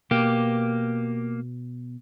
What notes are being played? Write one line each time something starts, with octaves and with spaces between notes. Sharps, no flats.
B2 A#3 G4